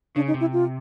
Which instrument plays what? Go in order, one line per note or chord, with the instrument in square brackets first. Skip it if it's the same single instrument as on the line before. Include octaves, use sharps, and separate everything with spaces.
[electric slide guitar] C#3 [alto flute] D4
[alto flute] D#4
[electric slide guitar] C3
[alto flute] E4
F4